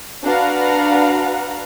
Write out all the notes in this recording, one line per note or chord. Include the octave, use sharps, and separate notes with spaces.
D4 F#4 B4 F5 F#5 A#5